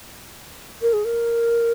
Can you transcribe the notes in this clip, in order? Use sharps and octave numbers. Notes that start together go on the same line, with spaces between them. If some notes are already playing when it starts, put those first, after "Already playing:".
A#4
G#4
A#4